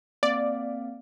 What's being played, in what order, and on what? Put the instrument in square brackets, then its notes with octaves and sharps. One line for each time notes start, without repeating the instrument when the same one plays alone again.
[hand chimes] A#3 C4 F5 [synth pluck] D5